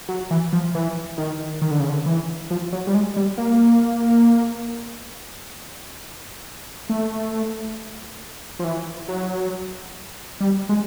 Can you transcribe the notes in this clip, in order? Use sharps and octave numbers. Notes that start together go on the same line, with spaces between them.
F#3
E3
F3
E3
D#3
D#3
D3
C#3
D3
E3
F3
F#3
G3
G#3
G3
A#3
A3
F3
E3
F#3
G3
G#3